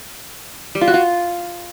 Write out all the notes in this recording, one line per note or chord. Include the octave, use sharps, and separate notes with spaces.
G3
F4
F#4
F4